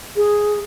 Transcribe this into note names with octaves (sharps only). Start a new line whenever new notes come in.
G#4